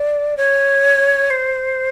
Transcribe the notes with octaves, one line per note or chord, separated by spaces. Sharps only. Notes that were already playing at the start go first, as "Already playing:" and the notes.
Already playing: D5
C#5
C5